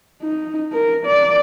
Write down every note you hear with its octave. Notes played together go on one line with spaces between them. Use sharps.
D#4
A#4
D5